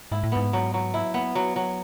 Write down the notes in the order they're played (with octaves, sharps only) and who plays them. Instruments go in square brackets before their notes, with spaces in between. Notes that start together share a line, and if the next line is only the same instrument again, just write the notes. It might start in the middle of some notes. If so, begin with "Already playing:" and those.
[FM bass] G#2 [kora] E4
[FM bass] A2
[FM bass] G#2 [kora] B3
[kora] F#3
F#3
E4
B3
F#3
F#3